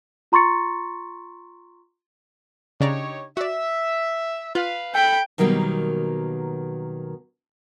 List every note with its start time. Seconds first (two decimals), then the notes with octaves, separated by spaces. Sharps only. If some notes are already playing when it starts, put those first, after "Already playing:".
0.32 F4 A#5 C6 C#6 A6 C#7
2.80 C#3 D4 D#4 G4 C#5 A#5
3.37 F#4 D5 E5
4.55 F4 B4 F5
4.95 A4 G5 B5
5.38 B2 D#3 F#3 G3 A#3 B3